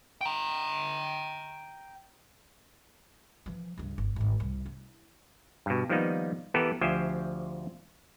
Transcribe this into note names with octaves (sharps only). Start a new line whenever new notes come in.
G5 A#5
E3 F3
C#2 G2
G1
G#1 D2
C2
E4
G2 B2
D#3 F3 G3 A#3 B3 D#4
E3 B3 G4 A4 A#4
D2 F3 G4 C5 E5 G#5